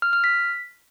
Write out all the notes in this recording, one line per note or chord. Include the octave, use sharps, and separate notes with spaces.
F6
F6
B6